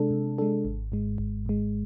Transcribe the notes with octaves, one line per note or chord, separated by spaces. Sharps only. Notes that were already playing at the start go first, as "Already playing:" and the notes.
Already playing: C3 G#3 D4 A4
C3
G#3 D4 A4
G#1
G#2 G#3
G#1
G#2 G#3